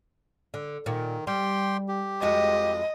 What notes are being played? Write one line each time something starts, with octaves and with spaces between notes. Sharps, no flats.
D3
A#2 D#3
G3 G4 G5 C6
G4
F2 G#3 F#4 D#5